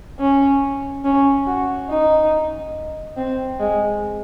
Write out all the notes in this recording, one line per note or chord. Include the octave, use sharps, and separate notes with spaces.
C#4
C#4
F#4
D#4
C4
G#3